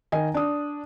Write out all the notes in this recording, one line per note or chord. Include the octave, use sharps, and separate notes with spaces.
D#3 D#5 G#5
D4 D#6